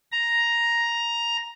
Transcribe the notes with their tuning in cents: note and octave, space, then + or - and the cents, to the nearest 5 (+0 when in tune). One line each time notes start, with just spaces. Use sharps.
A#5 +5